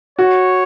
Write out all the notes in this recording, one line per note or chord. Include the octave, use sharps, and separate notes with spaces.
F#4 C#5